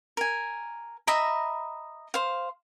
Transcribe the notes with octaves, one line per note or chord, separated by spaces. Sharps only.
A#4 G#5
D#5 E5 A#5 B5
C5 F5